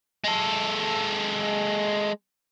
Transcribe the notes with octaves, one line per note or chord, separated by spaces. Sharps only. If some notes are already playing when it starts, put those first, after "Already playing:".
G#3 A4